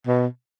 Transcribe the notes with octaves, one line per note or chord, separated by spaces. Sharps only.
B2